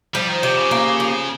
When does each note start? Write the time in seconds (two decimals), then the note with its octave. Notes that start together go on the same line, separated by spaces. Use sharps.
0.14 F3 G3
0.29 D#3
0.42 C3 G4
0.57 C#3
0.71 A#3
1.00 F3